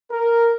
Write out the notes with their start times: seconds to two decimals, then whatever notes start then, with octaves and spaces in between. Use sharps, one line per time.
0.12 A#4